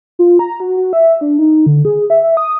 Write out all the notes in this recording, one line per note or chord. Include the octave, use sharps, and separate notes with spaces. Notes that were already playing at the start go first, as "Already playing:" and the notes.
F4
A#5
F#4
F#4
E5
D4
D#4
D3
G#4
E5
E5
D#6